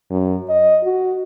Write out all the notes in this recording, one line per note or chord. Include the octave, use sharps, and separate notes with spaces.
F#2
D#5
F#4